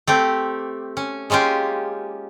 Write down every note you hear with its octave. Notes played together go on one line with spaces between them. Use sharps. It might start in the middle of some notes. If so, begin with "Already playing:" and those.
A3 C4 G4
C#4
G#3 A#3 C#4 F4 G4